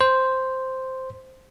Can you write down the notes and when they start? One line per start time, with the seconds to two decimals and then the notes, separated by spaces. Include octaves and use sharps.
0.01 C5